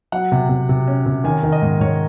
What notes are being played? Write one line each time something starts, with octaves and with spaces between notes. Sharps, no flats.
F#3 F#5
C3
C3
C3
C#4
C3
D#3 G#5
D#3
D#5
G#2
G#2 C#5